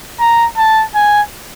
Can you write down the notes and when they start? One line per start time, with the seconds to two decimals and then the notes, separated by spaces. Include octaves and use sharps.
0.20 A#5
0.57 A5
0.95 G#5